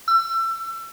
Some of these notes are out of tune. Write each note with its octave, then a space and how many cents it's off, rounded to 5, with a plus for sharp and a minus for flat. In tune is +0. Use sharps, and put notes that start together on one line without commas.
E6 +30